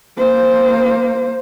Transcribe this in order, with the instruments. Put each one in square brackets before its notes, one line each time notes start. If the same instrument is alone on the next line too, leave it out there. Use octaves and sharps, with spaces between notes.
[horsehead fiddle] A#3 C5